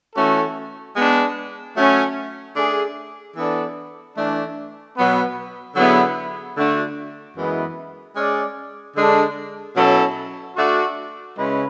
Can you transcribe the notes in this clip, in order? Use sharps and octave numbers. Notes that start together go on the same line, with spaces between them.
E3 A3 C#4 F#4 A4
G#3 B3 D4
F#3 A3 C#4
A3 D4 G#4
E3 B3 D4 A4 D5
E3 A3 D4
B2 F#3 B3
D3 F#3 B3 E4 G#4
D3 A3 D4 F#4
F#2 E3 G#3 B3 E4
G#3 C#4 G#4 D5
D3 G#3 D4 A4
B2 F#3 C#4 E4 A4
A3 D4 F#4
C#3 G#3 C#4 E4 B4